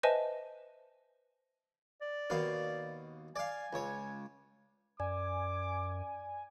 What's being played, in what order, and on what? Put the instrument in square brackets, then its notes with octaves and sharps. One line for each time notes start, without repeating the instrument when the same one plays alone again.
[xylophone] B4 C5 D#5 E5 G#5 A5
[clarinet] D5
[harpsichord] D#2 B2 F5
[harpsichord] D5 F5 [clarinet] G#5
[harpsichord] C#2 C#5
[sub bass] F#2 [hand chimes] D5 [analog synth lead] G#5 [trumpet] D6